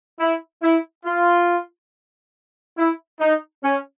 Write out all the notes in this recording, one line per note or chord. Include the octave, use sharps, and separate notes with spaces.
E4
E4
F4
E4
D#4
C#4